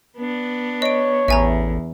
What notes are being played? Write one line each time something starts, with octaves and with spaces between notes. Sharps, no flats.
B3 D4
C#5 D#5 D7
A1 E2 E5 G#5 A#5